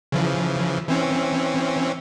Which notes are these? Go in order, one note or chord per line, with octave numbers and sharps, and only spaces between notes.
C#3 E3 F3
E3 C4 C#4